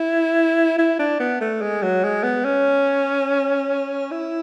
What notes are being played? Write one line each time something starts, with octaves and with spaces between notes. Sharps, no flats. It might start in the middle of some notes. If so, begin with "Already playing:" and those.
Already playing: E4
E4
D4
B3
A3
G#3
F#3
G#3
B3
C#4
E4